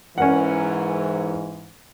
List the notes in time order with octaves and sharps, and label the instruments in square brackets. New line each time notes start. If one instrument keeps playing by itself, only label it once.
[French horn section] G#2 E3 [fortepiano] C#4 A#4 F#5